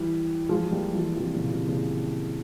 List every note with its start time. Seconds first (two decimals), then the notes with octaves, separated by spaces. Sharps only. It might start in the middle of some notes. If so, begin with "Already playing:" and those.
Already playing: E3 G3
0.49 F3 G#3
0.60 G#3
0.71 G3 A#3
0.94 E3 G3
1.16 C3 E3
1.35 A#2 C#3
1.51 C3
1.68 A#2 C#3